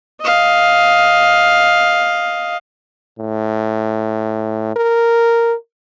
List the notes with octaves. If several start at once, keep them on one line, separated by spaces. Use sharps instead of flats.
D#5 F5
A2
A#4